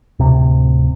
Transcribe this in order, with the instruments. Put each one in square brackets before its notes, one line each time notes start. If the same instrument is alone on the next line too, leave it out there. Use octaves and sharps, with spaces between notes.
[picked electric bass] D1 C3